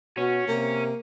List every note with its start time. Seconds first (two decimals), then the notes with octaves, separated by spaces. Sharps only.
0.18 B2 C#4 F#4
0.48 C3 A#3